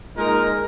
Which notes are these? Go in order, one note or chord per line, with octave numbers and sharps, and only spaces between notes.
A#2 G#3 D#4 A#4